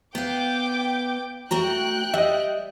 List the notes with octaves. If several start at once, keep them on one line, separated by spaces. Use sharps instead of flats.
B3 F5 G5 D6
A3 F#4 G5 A#5 F#6
G3 D#5 E5